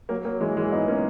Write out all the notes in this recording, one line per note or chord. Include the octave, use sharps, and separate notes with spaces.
F#3 A#3
F#3 A#3
E3 G#3
E3 G#3
B3 D#4
A#3 C#4